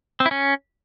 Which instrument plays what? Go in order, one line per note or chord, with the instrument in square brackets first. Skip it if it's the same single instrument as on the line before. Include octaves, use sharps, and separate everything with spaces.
[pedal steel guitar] C4
E4
C#4